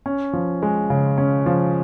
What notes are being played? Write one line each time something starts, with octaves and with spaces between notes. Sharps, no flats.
C#4
F3
G#3
C#3
C#4
F3